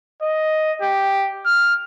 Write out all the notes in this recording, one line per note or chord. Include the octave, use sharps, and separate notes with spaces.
D#5
G4
F6